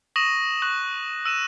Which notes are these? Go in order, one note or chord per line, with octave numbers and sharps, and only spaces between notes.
C#6 D#6 A#6 D#7 E7 F#7
C#6 D#6 F#6 F#7
E6 D#7 E7